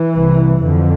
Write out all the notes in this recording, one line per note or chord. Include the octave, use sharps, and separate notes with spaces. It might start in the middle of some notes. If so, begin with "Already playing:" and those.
Already playing: E3
C2 C3
F2 D3